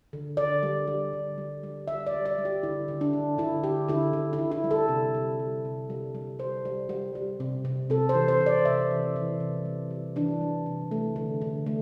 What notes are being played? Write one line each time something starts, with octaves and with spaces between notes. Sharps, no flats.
D3
D3 D5
G3
G3
D3
G3
G3
G3 E5
D5
G3
D5
G3
G4
D3 E4
D3
D4
D3
D3 E4
D3 G4
D3 E4
D3
E4
D3
E4
G3
A4
C3
G3
G3
C3
G3
G3
G3 C5
G3
G3
G3
C3
C3
C3 A4
C5
E3
C5
C3
D5
C3 E5
E3
E3
C3
G3
G3
E3 D4
G3
C3
A3
D3
D3
A3